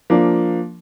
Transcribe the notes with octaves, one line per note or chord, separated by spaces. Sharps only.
F3 A#3 D4